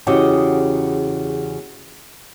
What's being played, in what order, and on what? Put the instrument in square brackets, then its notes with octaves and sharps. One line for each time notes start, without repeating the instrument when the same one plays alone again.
[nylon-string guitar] E2 C#3 F#4 G4 D#5